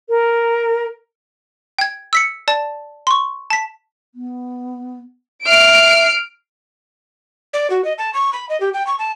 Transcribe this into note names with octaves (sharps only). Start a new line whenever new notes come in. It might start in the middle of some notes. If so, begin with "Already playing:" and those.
A#4
G5 G#6
E6 B6 C#7
D5 A5
C6 C#6
A5 B6
B3
E5 F6 C7 D7
D5
F#4
D#5
A5
C#6
B5
D#5
G4
G5
C#6
A5